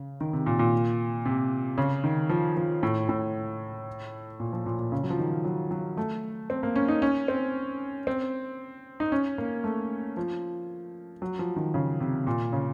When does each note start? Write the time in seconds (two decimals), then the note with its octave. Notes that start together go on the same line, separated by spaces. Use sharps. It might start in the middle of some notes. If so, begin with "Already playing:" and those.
Already playing: C#3
0.21 D#3
0.33 C3
0.46 A#2
0.59 A#2
1.25 C3
1.78 C#3
2.04 D#3
2.29 F3
2.57 F3
2.83 A2
3.09 A2
4.40 A#2
4.53 F3
4.66 A#2
4.79 A#2
4.92 C#3
5.03 F#3
5.10 F3
5.19 D#3
5.45 F#3
5.71 F#3
5.97 A3
6.50 C4
6.63 A#3
6.76 C#4
6.88 D#4
7.02 C#4
7.28 C4
8.07 C4
9.00 D#4
9.12 C#4
9.38 A#3
9.64 A3
10.17 F3
11.22 F#3
11.39 F3
11.56 D#3
11.74 C#3
12.00 C3
12.27 A#2
12.53 C#3